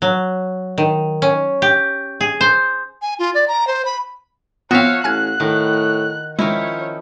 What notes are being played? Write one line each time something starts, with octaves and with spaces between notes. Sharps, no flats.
F#3
D#3
C#4
G4
G#4
C5
G#5
F4
D5
A#5
C5
B5
F3 B3 C4 F#4 C#5 E5 F5
A1 G#5 F6 F#6 G#6
A2 D#3
D#3 F3 G#3 C#4 E4 C#5